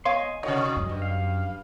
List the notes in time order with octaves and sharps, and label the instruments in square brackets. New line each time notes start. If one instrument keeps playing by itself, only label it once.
[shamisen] B3 C#5 F5 [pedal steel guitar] D#5 G#5 C6
[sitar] C3 F#4 C#5 [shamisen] D#3 [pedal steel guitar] D#5
[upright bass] F#2
[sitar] G2
[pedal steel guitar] F5